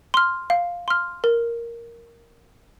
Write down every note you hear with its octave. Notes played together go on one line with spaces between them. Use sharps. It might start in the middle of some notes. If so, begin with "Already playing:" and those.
C6 F6
F5
C6 F6
A#4